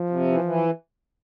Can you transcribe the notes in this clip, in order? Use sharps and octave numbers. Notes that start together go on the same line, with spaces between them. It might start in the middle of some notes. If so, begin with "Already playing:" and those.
Already playing: F3
C3
E3
E3